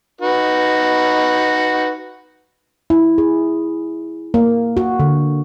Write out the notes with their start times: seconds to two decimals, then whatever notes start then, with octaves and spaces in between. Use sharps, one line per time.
0.21 D#4 F#4 B4
2.90 E4
3.18 G#4
4.34 A#3
4.77 F#4
4.99 D3